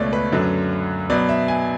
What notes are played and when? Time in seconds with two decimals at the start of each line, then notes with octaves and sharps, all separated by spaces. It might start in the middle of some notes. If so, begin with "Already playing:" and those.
Already playing: C#2 B2 A3 B4 C#5 D5
0.13 B4
0.32 F#2 D3 F#3
1.10 B2 F#3 B3 D5
1.29 E5
1.48 G#5